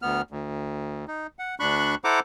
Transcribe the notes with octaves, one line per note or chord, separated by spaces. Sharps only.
D2 B3 F6
D2
D#4
F#5
D2 D4 B5 C#6 F#6
E4 A4 C5 F#5 A#5 D6